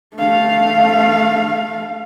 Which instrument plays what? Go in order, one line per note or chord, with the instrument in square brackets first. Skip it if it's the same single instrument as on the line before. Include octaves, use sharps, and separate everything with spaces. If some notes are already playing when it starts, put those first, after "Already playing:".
[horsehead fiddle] A3 F5